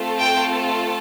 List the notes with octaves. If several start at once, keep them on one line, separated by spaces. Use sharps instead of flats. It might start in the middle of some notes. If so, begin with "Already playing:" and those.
Already playing: A3 C4 F4 A4
G5